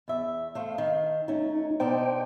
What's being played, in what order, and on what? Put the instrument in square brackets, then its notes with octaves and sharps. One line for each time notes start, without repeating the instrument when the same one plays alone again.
[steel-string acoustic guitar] E2 E5
[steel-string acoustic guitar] A3 C5 [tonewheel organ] F5
[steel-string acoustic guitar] D#3
[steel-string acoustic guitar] A3 C#4 [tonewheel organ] D#4
[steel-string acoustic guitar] B2 D4 D#4 [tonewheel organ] C5 G5